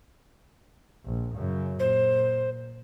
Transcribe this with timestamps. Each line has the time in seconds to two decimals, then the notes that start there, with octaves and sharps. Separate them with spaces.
1.05 A#1
1.35 F#2 C#3
1.79 A#2 C5